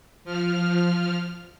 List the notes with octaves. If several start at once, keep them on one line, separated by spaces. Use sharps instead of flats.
F3 F6